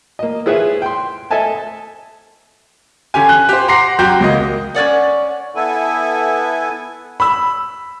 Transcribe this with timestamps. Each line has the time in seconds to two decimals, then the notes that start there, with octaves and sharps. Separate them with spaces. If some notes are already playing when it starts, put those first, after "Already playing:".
0.19 A#3 D#5
0.46 E4 F4 G#4 B4 C#5 E5
0.82 G5 C6
1.31 A4 D#5 E5 G#5 A5
3.14 D3 C#4 G4 G#5
3.29 F#6
3.49 G4 C5
3.68 F#5 A#5 C6 D6 A#6 C7
3.99 F#2 F#4 G4 G5 G6
4.21 C#2 A#3 D#5
4.75 C#4 B4 D5 F#5
5.56 B3 E4 A4 G#5
7.20 B5 E6